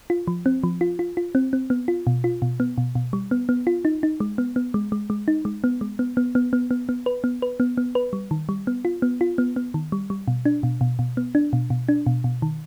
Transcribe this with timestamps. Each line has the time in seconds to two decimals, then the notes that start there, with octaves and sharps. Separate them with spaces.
0.10 F4
0.27 F3
0.46 C4
0.63 F3
0.81 F4
0.99 F4
1.17 F4
1.35 C4
1.53 C4
1.70 B3
1.88 F4
2.07 B2
2.24 F4
2.42 B2
2.60 B3
2.78 B2
2.95 B2
3.13 G3
3.31 B3
3.49 B3
3.67 F4
3.85 D#4
4.03 D#4
4.20 G#3
4.38 B3
4.56 B3
4.74 G#3
4.92 G#3
5.10 G#3
5.28 D#4
5.45 G#3
5.64 B3
5.81 G#3
5.99 B3
6.17 B3
6.35 B3
6.53 B3
6.71 B3
6.89 B3
7.06 B4
7.24 B3
7.42 B4
7.60 B3
7.77 B3
7.95 B4
8.13 G3
8.31 D#3
8.49 G3
8.67 B3
8.85 F4
9.02 B3
9.21 F4
9.38 B3
9.56 B3
9.74 D#3
9.92 G3
10.10 G3
10.28 B2
10.45 D4
10.63 B2
10.81 B2
10.99 B2
11.17 B3
11.35 D4
11.53 B2
11.70 B2
11.89 D4
12.06 B2
12.24 B2
12.42 D#3